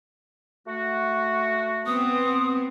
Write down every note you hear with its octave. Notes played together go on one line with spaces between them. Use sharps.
A3 F#4
B3 C4 D#6